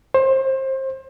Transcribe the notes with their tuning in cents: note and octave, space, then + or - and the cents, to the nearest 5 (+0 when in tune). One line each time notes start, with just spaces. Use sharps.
C5 +25